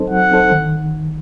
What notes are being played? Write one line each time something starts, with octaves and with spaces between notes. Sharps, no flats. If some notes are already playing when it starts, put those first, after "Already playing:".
Already playing: F#3 C4 D#4 A4 C5
F#3 F#5
C4 D#4 A4 C5
D#3